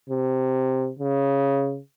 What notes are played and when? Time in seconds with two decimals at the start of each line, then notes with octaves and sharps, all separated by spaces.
0.10 C3
0.99 C#3